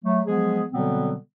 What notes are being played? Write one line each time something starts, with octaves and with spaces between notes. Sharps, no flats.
F#3 A3
F3 F#3 G#3 B3 G#4
B2 D3 F#3 G3 B3 C4